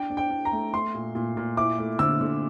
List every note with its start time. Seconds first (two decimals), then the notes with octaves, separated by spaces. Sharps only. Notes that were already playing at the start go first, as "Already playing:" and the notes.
Already playing: D4 G5
0.10 D4
0.17 G5
0.30 D4
0.45 A#5
0.52 A3
0.74 A3 C6
0.94 A#2
1.15 A#2
1.37 A#2
1.57 E4 D6
1.79 A3
1.99 D3 E6
2.21 D3